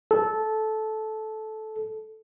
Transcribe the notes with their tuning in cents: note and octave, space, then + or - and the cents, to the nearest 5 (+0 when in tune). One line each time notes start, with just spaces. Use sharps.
A4 -15